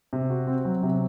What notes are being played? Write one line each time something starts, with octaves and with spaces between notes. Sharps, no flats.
C3
F#4
C4
F#3
C3